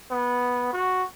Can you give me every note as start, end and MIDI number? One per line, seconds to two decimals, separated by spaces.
0.11 0.70 59
0.73 1.04 66